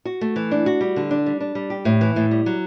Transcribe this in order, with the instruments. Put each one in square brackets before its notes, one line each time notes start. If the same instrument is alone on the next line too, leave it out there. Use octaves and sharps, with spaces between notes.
[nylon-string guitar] F#4
A3
E3
D4
F#4
G3
D3
D4
G3
D4
G3
G4
A2
E3
A2
G3
F#3